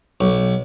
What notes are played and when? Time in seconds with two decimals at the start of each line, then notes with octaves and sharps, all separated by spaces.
0.21 B1